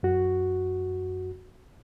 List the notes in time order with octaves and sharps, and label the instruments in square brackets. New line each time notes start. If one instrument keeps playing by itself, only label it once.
[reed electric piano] F#2 F#4